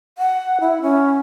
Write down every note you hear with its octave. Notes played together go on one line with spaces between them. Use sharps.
F#5
E4
C#4